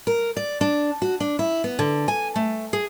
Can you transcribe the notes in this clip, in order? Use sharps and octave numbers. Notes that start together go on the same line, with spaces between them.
A#4
D5
D4
F#4
D4
E4
B3
D3
G#5
A3
G#4